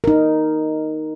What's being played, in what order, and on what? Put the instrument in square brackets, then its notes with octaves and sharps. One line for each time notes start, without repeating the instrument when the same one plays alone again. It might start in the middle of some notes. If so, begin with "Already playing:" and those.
[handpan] D#4 A#4